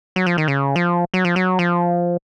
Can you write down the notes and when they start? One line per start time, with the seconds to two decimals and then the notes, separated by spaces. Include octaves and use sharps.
0.16 F#3
0.26 F3
0.38 D#3
0.48 C#3
0.76 F3
1.14 F#3
1.25 F3
1.36 F#3
1.59 F3